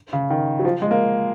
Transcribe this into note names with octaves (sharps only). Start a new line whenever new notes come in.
C#3
D#3
F#3
F3
G#3
A#3